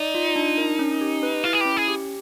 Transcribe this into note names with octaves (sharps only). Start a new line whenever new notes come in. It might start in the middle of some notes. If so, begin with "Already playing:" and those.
Already playing: D#4 D5
F4
D4
A#4
C#4
G4
B4
E4 F4
G#4
C#4 G4
G#4
G4